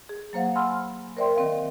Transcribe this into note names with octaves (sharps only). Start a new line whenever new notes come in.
G#4
F#3 A#3 C5 F5 F#5
F#5 G#5 B5 C6 E6 F6
A#4 C5 D5 E5 G5 C6
D#3 C4 F5